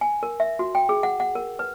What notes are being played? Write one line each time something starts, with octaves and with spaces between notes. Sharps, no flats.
G#5
A#4
E5
F#4
G5
G#4
F#5
F#5
A#4
B4